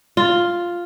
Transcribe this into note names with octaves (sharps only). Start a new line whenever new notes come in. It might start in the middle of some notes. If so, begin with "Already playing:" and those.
F4